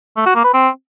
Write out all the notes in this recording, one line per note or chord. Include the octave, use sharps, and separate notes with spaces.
A3
F#4
A#3
B4
C4